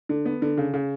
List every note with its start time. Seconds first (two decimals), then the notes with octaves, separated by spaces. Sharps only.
0.09 D3
0.25 B3
0.42 D3
0.58 C#3
0.74 C#3